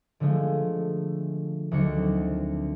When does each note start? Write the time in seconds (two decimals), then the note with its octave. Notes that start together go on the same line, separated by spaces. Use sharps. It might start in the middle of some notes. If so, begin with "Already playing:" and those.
0.20 D3 F3 G#3 A3
1.71 D2 D#3 F#3 D4 C#7
1.97 C4